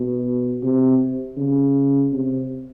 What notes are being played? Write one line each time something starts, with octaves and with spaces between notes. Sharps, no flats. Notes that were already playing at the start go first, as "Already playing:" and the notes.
Already playing: B2
C3
C#3
C3